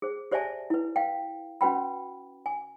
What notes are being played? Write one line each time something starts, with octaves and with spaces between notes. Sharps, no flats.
G#4 C5
G4 C5 D5 E5 G#5 A5
E4 B4
F5 G5
C#4 F#4 B4 G5 B5
G#5